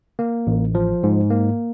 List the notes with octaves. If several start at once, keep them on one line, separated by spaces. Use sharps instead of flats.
A#3
A1
F3
G#2
A#3